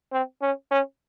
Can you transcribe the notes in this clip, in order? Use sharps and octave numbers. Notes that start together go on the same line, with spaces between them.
C4
C#4
C#4